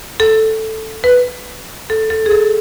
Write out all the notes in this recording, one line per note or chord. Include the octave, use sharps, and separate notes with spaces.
A4
B4
A4
A4
G#4
A4